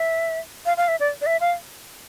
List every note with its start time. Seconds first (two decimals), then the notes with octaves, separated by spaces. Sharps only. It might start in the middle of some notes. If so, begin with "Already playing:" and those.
Already playing: E5
0.66 F5
0.77 F5
0.88 E5
1.00 D5
1.21 D5
1.26 E5
1.41 F5